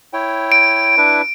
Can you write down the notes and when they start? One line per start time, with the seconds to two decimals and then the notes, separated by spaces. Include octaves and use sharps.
0.13 E4 C#5 G5
0.52 D7
0.97 D4 E4 B4